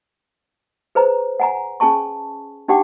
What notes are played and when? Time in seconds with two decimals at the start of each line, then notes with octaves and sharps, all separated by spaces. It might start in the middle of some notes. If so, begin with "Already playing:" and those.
0.95 G#4 B4 C5 A#5
1.40 F#5 G#5 A#5
1.80 C#4 G#4 G#5 A5 C#6
2.68 D4 D#4 G4 F#5 G5 D6